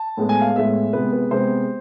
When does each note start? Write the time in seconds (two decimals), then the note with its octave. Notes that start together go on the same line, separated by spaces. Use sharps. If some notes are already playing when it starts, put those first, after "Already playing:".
Already playing: A5
0.17 A2 G#3 B3
0.29 G#5
0.41 F5
0.55 A2 G#3 B3 E5
0.93 C3 G#3 B3 B4
1.13 B4
1.31 C3 G#3 B3 C5